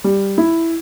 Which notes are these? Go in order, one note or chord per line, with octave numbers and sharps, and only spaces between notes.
G3
E4